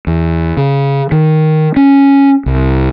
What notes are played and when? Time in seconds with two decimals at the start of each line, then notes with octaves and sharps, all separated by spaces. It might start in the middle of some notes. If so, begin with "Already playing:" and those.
0.07 E2
0.57 C#3
1.12 D#3
1.76 C#4
2.46 C2